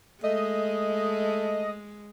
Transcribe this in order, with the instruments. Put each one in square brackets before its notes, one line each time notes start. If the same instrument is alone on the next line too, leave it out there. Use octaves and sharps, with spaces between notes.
[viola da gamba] G#3 [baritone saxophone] A3 [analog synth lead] D#5